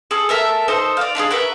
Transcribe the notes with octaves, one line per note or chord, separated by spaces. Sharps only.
G#4 A4
A4 A#4 E5 A5
D#4 A4 C5 D#5
D5 F5
D4 D#4 F4 G#4
F#4 A#4 B4 E5